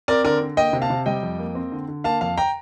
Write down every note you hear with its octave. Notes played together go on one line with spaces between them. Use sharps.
C4 A#4 D5
D3 A#4 D5
D3
A#3 D#5 G5
C3
F5 A5
C3
G3 D#5 G5
F2
A#3
C4
D3
D3
A#3 F5 A5
F2 F5 A5
G5 A#5